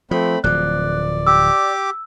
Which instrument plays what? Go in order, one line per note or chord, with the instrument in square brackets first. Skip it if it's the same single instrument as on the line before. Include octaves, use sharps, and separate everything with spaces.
[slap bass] F3 [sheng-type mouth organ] A3 C4 B5
[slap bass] D1 F3 [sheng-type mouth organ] D5 [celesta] F#6
[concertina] G4 D6 [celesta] E6